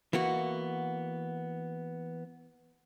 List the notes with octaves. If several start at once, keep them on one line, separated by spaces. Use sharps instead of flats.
E3 A#3 B3 F#4